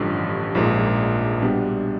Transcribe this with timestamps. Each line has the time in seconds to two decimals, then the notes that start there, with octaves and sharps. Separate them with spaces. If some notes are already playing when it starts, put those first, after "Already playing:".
Already playing: A1 G2 D3 F3
0.55 A#1 G#2 F3 A#3
1.42 B2 G3 B3 D4